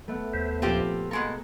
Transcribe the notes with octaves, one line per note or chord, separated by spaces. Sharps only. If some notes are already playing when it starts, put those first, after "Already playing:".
A3 B3
D#2 C5 E5
A#2 F3 C4 F4 G4
B2 G#3 A#3 A4 A#5